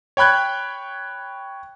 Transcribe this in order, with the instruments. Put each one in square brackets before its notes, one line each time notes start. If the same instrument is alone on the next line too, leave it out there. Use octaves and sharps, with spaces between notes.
[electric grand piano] C#5 G5 B5 F#6 G#6